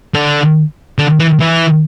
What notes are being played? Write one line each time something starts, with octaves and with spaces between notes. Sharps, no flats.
D3
D3
E3
E3